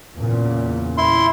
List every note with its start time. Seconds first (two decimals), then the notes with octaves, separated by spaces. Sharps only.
0.16 E2 A#2 C#3
0.98 E4 C6